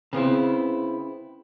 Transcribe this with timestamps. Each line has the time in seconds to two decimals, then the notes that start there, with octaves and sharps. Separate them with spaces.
0.13 C#3 B3 C4 E4